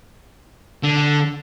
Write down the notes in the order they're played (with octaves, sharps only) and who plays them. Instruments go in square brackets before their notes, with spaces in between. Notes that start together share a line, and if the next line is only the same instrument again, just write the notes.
[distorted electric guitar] D3